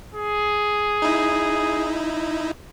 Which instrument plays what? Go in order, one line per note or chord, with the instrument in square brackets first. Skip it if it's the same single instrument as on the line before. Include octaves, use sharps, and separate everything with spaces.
[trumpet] G#4
[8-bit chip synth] D#4 E4